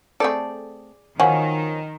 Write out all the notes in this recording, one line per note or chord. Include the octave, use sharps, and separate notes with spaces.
A3 C4 G#4 A4 D5
D#3 F3 F#3 A#3 C#4 F#5 G#5